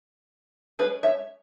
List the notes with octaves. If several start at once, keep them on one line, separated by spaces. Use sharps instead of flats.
G#3 C#4 G#4 B4
C#5 E5